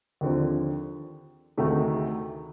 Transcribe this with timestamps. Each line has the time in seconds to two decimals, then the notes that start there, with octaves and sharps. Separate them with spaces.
0.21 D#2 D3 F3 C4
1.57 D2 C3 D#3 A3 D#4